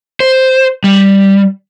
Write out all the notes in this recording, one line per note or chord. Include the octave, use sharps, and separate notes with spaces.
C5
G3